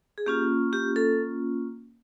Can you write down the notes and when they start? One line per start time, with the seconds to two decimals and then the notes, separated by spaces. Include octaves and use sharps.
0.18 G#4
0.26 A#3 C#4 F4 G4
0.73 G4
0.96 A4